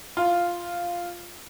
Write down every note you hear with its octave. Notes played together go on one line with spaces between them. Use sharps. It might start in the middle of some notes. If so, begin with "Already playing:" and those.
F4